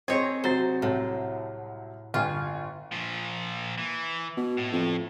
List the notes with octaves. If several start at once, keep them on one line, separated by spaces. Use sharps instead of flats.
C4 G#4 C#5 D#5 A#5 G#6
C3 F#3 C5 A6
C2 A2
G1 F4 G5 G#5
A#2 F3
E3
B2
A2
F2